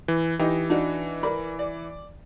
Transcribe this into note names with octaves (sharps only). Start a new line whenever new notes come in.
E3
E3 D#4 G4 D#5
D4 D#4 F#4
A#4 D5 B5
D5